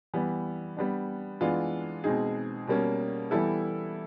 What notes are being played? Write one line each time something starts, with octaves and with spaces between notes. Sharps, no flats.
E3 G3 B3
G3 B3 D4
E3 G#3 B3 D4 F4
B2 G#3 C4 D#4 G#4
B2 G3 A#3 C#4
E3 G3 B3 E4 A4